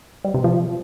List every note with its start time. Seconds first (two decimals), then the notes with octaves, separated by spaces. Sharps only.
0.24 G3
0.34 C3
0.44 F3